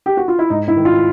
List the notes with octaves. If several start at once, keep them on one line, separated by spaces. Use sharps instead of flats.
G4
F#4
F4
E4
G#2 D#4
E4
D#3
F4